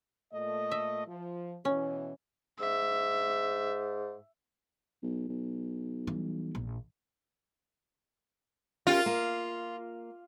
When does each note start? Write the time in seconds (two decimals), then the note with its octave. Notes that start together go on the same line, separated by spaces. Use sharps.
0.33 A#2 A3 D#5
0.71 E5
1.07 F3
1.65 B2 E3 C#4
2.60 G#2 E5
5.03 B1
5.29 B1
6.07 E3 G3
6.55 A#1
8.87 C#4 F4 G4 A#4
9.06 A#3